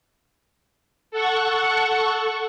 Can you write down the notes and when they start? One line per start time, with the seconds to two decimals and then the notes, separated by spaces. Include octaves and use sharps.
1.11 A4 F#5 C#6